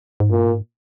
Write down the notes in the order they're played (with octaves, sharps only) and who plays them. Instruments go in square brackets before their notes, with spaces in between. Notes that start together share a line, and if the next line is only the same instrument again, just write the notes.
[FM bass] G#2
[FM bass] G2 [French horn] A#2
[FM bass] G#2